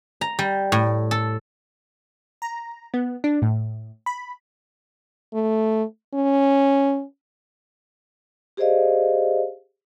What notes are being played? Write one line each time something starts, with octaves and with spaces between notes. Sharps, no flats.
A#5
G3
A2
A4
A#5
B3
D4
A2
B5
A3
C#4
G4 G#4 C5 D5 D#5 F5